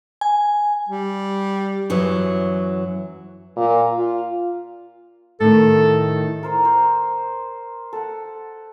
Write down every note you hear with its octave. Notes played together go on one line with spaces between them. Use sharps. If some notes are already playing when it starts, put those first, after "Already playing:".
G#5
G3
F#2 E3 F#3
A#2
F4
A2 D#3 A4
A#4 C5 A#5
C5
A4 F#5